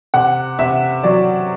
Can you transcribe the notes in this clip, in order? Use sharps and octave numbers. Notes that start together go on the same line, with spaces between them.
C3 F#5
C3 E5
F#3 D5